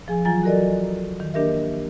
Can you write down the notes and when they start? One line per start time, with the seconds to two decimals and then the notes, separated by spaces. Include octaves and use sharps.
0.08 F3 G#4 G#5
0.25 E3 F#3 F4 G#5 A#5 A6
0.43 F#4 A4 A#4 D5 D#5
1.20 D#3
1.34 A#3 D4 G4 A#4 D#5 E5